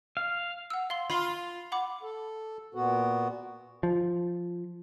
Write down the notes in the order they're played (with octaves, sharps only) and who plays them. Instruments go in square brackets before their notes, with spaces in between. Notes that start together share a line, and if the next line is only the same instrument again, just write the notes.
[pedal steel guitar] F5
[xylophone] F#5 E6
F5 C6 G7
[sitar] F4 [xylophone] B5 C7 G7
[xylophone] F#5 B5 D6
[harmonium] A4
A#2 B3 F#4
[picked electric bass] F3